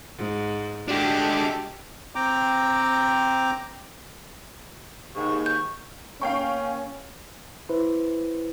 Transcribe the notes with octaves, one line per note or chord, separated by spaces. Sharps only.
G#2
G#3 D4 F#4 G4 A4 D6
C4 G5 A#5 D6
D#2 G#2 C#6
G6
A#3 C#4 F5 G5 C#6
E4 B4 C5